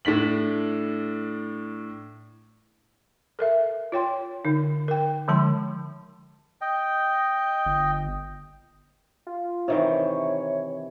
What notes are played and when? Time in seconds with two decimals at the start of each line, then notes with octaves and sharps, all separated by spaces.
0.05 A2 D4 B6 F#7
3.39 A4 A#4 E5
3.92 F4 C#5 G5 C6
4.45 D3 D#4
4.88 A#4 G5
5.28 D3 F3 G#3 A5 C6
6.61 D#5 G5
7.66 G1
9.27 F4
9.68 C3 D#3 E3 C#5